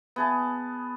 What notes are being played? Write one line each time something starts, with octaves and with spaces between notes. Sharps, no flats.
B3 G#4 A5